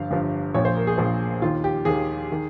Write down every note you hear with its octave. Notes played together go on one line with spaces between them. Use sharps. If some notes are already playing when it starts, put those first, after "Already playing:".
Already playing: G1 G2 F3 F5
G1 G2 F3
A#1 A#2 F3 C#5
C5
A#4
G#4
A#1 A#2 F3
D#2 D#3 F4
G4
D#2 D#3 G#4
D#3